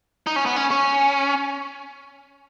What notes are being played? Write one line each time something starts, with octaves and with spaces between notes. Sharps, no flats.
D#4
C#4
B3
C#4
C#4